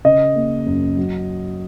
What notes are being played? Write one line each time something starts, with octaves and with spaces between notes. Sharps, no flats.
C#3 D#5
A#3
F#2
F#3